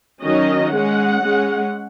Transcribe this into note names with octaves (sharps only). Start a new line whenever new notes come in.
D#3 F#3 C#4 D#5
G#3 C#4 F#5
G#3 C#4